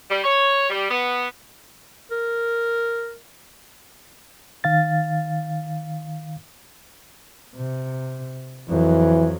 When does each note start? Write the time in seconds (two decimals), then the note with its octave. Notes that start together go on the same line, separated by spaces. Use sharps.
0.11 G3
0.24 C#5
0.70 G3
0.90 B3
2.11 A#4
4.64 D#3 F5 A6
7.56 C3
8.70 F2 E3 F#3